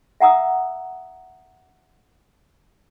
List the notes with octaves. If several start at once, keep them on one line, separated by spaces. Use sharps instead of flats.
E5 F#5 A#5 D#6 E6